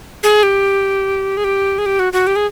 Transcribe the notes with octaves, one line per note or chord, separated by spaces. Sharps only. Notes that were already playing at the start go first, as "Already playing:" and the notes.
G#4
G4
G#4
G4
G#4
G4
F#4
F#4
G4
G#4